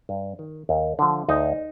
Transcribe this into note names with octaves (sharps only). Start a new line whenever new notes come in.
G2
D#3
D#2
D3 F3
D2 D#4